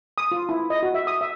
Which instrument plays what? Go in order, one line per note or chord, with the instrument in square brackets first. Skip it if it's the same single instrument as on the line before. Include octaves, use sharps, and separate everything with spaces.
[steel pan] D#6
F4
E4
D#5
F#4
E5
D#6
E5